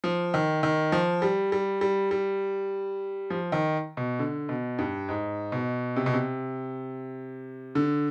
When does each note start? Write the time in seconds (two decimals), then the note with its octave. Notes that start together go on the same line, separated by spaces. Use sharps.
0.04 F3
0.34 D#3
0.63 D#3
0.92 F3
1.22 G3
1.52 G3
1.81 G3
2.11 G3
3.30 F3
3.52 D#3
3.97 B2
4.19 D3
4.49 B2
4.79 G2
5.09 G#2
5.52 B2
5.96 C3
6.06 B2
6.14 C3
7.75 D3